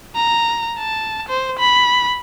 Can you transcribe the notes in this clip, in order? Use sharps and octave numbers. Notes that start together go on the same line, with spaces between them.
A#5
A5
C5
B5